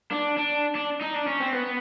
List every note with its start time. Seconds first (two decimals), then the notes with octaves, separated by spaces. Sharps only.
0.12 D4
0.37 D4
0.75 D4
1.02 D#4
1.15 D4
1.28 C#4
1.40 C4
1.54 B3